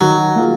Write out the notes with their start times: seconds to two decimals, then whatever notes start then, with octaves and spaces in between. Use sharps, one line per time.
0.01 D#3 F#3
0.35 A#3 F4 G#4